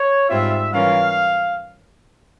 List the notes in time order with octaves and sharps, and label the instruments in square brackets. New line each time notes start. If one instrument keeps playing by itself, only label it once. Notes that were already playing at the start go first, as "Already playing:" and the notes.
Already playing: [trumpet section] C#5
[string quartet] G#2 G3 C4 F4 [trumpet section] E5
[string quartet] E3 G3 C#4 F4 A#4 [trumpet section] F5